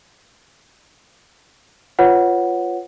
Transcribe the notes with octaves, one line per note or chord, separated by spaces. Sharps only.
F4 B4 C#5 F#5